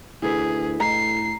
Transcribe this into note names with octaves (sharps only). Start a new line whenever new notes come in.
D2 E4 G#4 A4 B4
A2 A#5 C7